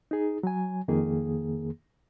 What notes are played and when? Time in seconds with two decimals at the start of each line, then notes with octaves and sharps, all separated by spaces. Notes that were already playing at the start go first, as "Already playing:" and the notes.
0.11 D#4 G#4
0.43 F#3 G#5
0.88 F2 D#3 A#3 G#4